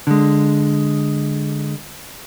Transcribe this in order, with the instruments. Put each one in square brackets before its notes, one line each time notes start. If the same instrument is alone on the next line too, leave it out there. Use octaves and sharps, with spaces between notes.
[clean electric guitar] D3 G#3